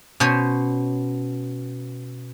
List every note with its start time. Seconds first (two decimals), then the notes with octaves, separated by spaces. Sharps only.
0.20 B2 C#4 C5 C#5